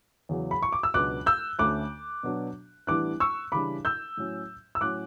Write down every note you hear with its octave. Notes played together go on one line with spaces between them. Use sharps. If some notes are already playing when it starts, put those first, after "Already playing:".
E2 C#3 F#3
B5
C#6
D6
E6
C#2 B2 F#3 B3 D4 D6 F#6
E6 G6
D2 D3 A3 C#4 D6 F#6
B2 F#3 B3 D4
A2 E3 G3 B3 D4 D6 F#6
C#6 E6
C#3 E3 G3 D4 B5 D6
E6 G6
A2 F#3 C#4
E6
A2 F#3 C#4 D6 F#6